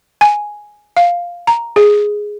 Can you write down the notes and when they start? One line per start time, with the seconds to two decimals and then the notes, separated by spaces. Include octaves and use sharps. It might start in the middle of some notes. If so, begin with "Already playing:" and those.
0.21 G#5
0.97 F5
1.47 A#5
1.76 G#4